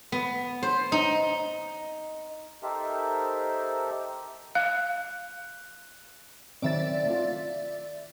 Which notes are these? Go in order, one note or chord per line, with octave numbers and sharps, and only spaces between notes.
B3
C5
D#4
D#4 G4 A4 A#4 C5 E5
F5 F#6
D#3 F#3 C4 D5 E5 A6
A3 F4